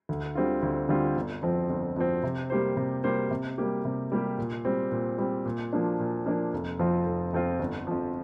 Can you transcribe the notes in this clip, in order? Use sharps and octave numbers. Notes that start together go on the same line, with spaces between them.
D2
D3 G3 C4 F4
D2
D3 G3 C4 F4
G1
F2 F3 C4
G1
F2 F3 C4
C3
G3 A#3 G4 C5
C3
G3 A#3 G4 C5
C3
G3 A#3 G4
C3
G3 A#3 G4
A#2
G3 C4
A#2
G3 C4
A#2
F3 A#3 D4
A#2
F3 A#3 D4
F1
F2 F3 C4 F4
F1
F2 F3 C4 F4
G1
F2 F3